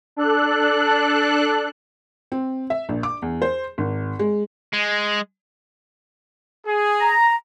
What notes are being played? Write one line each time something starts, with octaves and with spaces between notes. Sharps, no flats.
D4 A4 F#6
C4
E5
A#1
D6
E2
C5
G#1
G#3
G#3
G#4
A#5